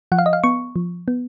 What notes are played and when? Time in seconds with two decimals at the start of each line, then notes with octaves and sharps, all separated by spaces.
0.12 F3 F#5
0.18 F5
0.26 D#5
0.33 F5
0.44 B3 C#6
0.76 F3
1.08 B3